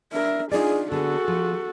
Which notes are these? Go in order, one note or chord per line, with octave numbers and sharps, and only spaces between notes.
D4 A#4 E5
D4 D#4 F4 G#4 D5
D3 B3 F#4 G#4 A4
F3